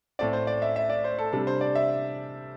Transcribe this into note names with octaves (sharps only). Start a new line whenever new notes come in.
A2 A3 C4 D5
C5
D5
E5
E5
D5
C5
A4
C3 G3 D4 A4
C5
D5
E5